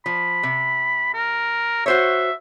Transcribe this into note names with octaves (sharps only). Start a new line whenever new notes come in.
F3 B5
C3
A#4
F#4 C5 C#5 E5